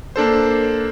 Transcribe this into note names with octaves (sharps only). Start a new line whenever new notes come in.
A#3 D4 A4 C5